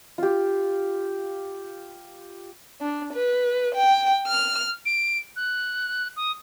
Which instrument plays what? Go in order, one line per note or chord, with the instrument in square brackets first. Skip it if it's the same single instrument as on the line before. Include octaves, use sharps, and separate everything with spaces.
[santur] F4 G4
[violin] D4
B4
G5
F6
[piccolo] D7
F#6
D#6